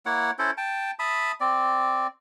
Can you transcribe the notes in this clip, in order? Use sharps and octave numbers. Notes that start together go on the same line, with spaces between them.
A#3 E4 C#5 F#5
C#4 E4 A4 C5
G5 A5
E5 A5 B5 D#6
C4 D5